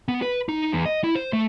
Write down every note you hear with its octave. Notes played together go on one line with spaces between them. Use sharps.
B3
B4
D#4
E2
D#5
E4
C5
A3